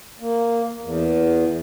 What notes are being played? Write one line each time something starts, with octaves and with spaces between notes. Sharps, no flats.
A#3
E2